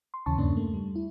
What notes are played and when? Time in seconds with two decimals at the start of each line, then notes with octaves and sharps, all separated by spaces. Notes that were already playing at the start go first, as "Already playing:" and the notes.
0.14 C6
0.26 D#2 C#3 E3 C#4 A5 C#6
0.38 E2 G2 C#3 A#3 C#4 D4
0.56 A3 A#3
0.74 G3
0.95 E4